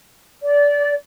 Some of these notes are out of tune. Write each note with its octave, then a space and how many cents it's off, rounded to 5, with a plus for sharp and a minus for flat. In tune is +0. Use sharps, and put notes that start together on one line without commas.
D5 -25